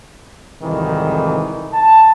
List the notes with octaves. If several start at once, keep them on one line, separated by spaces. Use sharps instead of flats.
C2 F2 G#2 D#3 E3
A5